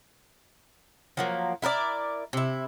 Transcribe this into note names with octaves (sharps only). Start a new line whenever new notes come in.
F3 F#3 A#3
E4 A#4 B4 D5
C3 E4